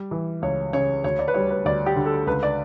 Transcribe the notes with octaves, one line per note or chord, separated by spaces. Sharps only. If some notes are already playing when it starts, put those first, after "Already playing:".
Already playing: G3
E3
C#2 C#5
C#3 C#5
D2 C#5
D5
B4
G3 C#5
B4
D2 D5
G4
D3
A4
C#2 B4
D5